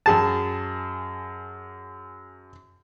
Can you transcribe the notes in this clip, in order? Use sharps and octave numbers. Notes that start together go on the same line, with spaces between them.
F#2 G#4 A5